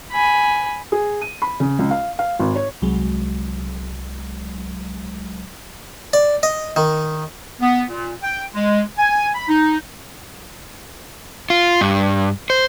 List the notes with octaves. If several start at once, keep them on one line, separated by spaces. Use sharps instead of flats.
G#5 B5
G#4
D#7
B5
C#3
C#2
F5
F5
G#1
C#5
C2 F#3 G#3
D5
D#5
D#3
B3
A#2
G5
G#3
G#5
B5
D#4
F4
G2
C5